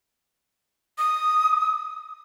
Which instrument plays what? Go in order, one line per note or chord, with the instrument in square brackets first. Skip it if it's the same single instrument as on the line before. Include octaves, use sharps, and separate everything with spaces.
[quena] D#6